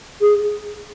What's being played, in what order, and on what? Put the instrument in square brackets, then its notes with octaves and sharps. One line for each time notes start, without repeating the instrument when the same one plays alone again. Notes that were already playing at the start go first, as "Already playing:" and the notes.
[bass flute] G#4